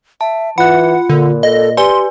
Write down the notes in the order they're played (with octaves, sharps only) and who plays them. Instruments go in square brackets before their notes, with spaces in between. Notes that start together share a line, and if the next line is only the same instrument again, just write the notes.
[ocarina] E5 [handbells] A5
[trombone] E3 [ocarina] F4 [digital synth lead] F#5 [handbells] B5 F#6
[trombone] A#2 [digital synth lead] D3
[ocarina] A4 [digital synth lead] D#5
[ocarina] G4 [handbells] B4 D5 G#5 [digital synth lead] C6